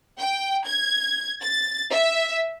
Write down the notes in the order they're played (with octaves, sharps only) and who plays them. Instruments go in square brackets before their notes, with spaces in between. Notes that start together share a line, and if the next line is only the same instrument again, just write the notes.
[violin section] G5
G#6
A6
E5